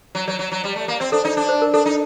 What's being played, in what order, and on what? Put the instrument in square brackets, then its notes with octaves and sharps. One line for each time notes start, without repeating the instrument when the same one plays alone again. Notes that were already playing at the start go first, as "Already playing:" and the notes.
[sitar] F#3
[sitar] F#3 [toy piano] D5
[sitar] F#3
F#3
G3
A3
A#3
[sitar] C4 [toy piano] D5
[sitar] D4 [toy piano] A4
[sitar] D#4 [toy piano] D5
[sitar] D4 [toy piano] D5
[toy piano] C5
A#4
[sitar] D4 [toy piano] A4
[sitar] D#4